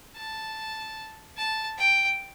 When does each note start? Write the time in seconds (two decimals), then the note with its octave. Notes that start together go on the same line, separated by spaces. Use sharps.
0.17 A5
1.37 A5
1.78 G5